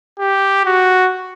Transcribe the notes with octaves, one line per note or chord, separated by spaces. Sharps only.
G4
F#4